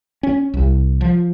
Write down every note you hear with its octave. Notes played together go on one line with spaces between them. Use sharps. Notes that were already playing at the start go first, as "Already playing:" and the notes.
C#4
C2
F3